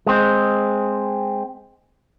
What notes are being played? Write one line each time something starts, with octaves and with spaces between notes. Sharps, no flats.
G#3 C4